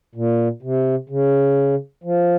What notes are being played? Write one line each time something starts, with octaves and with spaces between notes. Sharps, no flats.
A#2
C3
C#3
F3